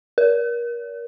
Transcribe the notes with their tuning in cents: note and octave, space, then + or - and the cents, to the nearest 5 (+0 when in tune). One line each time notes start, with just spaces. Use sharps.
A#4 +25